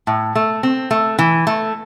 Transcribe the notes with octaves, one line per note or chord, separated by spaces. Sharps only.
A2
A3
C4
A3
E3
A3